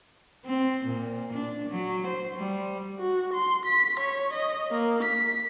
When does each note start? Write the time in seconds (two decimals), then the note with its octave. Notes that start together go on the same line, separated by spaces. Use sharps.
0.45 C4
0.85 A#2
1.33 D4
1.69 F#3
2.07 C5
2.36 G3
2.99 F#4
3.34 C6
3.66 B6
4.00 C#5
4.33 D#5
4.71 A#3
5.03 B6